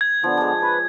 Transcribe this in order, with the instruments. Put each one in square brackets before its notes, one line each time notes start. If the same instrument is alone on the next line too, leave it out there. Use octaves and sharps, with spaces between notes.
[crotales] G#6
[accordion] D3 B3 [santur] F3
[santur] G#3 D4
[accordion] B4 [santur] C#5